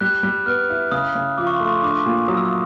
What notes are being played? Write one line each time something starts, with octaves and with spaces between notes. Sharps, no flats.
G3 F#6
G3
B3 F6
E4
C#3 D#6
C#3
F3 D6
C#6
C6
A3 C#6
D4 D6
A#2
F#3 D#6
E6
D#6